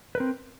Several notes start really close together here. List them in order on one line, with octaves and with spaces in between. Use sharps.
B4 A#4 C4